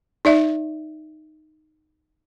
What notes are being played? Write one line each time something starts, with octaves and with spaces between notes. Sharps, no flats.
D#4 D5 E5